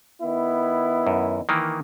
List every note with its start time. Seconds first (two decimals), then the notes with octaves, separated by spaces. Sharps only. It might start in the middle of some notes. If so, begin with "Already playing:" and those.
0.22 D#3 B3 E4
1.07 F#2
1.49 D#3 E3 A#3